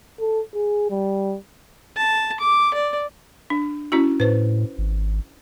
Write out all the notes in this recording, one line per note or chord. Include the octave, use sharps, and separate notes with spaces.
A4
G#4
G3
A5
D6
D5
D4
C#4 E4 F#4
A2 B4 C5
G#1